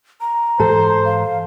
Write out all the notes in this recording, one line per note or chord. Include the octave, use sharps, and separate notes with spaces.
A#5
G#2 E3 A4 C5
F5